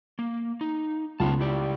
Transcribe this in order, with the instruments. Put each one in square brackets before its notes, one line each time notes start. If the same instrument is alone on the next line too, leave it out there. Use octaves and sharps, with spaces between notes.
[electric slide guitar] A#3
D#4
[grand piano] C#2 [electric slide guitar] B3 F4 A5
[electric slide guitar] E4 G4 D5